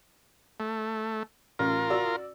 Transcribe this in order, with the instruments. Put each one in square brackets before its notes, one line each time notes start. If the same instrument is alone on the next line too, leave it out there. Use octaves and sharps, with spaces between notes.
[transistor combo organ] A3
[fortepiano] A1 [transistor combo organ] F4 A#4
[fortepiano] F#4 D5 E6